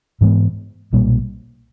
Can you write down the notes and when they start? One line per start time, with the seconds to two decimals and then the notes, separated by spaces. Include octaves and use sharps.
0.21 G#2 E3 G#3 B3
0.93 B1 A#2 G3 A#3